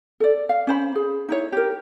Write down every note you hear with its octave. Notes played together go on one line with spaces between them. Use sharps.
A4 D5
F5
C#4 C5 B5
G#4
D#4 E4 C#5
G4 A#4